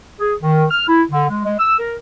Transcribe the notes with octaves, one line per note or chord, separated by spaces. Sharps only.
G#4
D#3
F6
E4
D3
G#3
G#3
E6
A#4